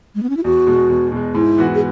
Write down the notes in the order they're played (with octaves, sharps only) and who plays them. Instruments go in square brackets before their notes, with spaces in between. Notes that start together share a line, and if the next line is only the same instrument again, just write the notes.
[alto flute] G#3
B3
C#4
E4
[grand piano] E2 [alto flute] F#4
[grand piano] B2 G#3
E2
B2 G#3
[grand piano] G#2 [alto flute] E4
[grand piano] E3 B3 F#4
[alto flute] G#4